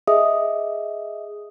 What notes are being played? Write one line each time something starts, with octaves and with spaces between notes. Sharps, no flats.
G#4 D#5 E5 D#6